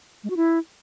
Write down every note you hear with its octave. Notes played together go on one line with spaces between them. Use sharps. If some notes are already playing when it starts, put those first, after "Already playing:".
G#3
F#4
E4